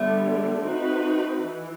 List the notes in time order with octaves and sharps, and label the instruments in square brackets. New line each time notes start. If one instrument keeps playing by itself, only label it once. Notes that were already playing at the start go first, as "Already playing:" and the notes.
Already playing: [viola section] D3 G3 B3 [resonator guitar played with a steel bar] A3
[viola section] C4 D#4 F#4 B4
E3